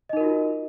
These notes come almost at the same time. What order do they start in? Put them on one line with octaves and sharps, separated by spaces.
D#5 D#4 A#4 F#4 F4